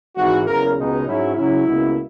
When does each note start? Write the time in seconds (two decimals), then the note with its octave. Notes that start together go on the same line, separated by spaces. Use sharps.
0.16 G#1 G#2 E3 F#4
0.46 F#1 E2 C#3 A#4
0.76 C#2 B2 G#3 D#4
1.05 G#2 F#3 C#4 E4
1.35 C#2 C#3 F#3 C#4 E4
1.65 C#2 B2 A#3